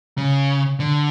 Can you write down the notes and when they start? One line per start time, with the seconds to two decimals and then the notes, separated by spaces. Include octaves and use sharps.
0.18 C#3
0.80 D3